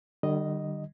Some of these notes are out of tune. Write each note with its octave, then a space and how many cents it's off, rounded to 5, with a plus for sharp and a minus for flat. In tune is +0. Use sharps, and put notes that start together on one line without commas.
D3 +40 G3 -15 D#5 +0